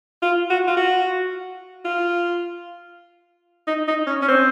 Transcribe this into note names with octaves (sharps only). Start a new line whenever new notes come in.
F4
F#4
F4
F#4
F4
D#4
D#4
C#4
C#4
C4